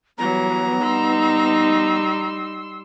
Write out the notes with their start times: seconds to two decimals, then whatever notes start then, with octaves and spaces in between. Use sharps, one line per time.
0.18 E3 F#3 G3 B3 A#5
0.82 G3 D#4 C6 E6